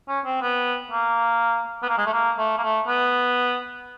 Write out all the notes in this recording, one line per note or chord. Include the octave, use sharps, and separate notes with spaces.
C#4
C4
B3
A#3
B3
A#3
G#3
A3
A#3
A3
A#3
A3
B3